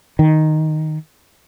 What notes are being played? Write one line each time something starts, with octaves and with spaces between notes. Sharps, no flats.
D#3